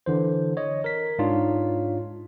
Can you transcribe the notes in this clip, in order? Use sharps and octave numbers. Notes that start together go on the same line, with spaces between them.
D3 E3 C5
C#5 D#5
A#4 B6
G#2 D4 D#4 F4 C#5